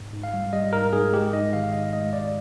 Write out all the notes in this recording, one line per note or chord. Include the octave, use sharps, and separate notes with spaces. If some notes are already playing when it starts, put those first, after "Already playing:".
Already playing: G#2
G#2
F5
G3
G3 D#5
G#2 A#4
G#2 G#4
G#3 G4
G#2 D#5
D#3 F5
G#2 D#5
G#3 D#5
G#2 D5